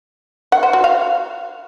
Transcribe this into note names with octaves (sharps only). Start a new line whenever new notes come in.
F#5
C5
F#4
F5